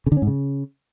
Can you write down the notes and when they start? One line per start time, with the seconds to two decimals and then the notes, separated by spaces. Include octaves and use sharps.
0.06 C#3
0.12 D3
0.17 C#4
0.22 G#2
0.27 C#3